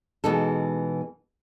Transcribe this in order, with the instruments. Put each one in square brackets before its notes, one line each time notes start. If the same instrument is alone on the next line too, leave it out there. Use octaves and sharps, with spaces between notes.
[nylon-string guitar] B2 E3 G#3 D#4 A4